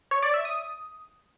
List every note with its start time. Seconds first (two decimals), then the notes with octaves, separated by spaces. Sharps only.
0.11 C#5
0.23 D5
0.34 E5
0.45 D#6